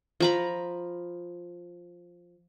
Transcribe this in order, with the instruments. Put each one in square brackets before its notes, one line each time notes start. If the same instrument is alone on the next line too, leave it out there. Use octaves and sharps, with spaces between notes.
[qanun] F3 A#5 B5